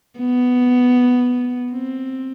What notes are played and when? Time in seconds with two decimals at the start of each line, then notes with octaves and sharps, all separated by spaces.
0.19 B3
1.71 C4